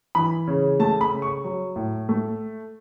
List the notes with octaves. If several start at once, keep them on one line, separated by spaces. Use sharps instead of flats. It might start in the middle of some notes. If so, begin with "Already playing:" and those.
E3 B5
C#3
A3 A5
B5
C#3
C#6
F#3
A2
A3